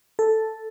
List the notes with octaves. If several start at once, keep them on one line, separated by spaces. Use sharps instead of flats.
A4